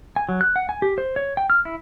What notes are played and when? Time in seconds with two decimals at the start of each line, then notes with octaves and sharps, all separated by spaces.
0.16 G#5
0.29 F#3
0.41 F#6
0.56 F#5
0.69 G#5
0.82 G4
0.98 C5
1.16 C#5
1.37 G5
1.50 F6
1.65 E4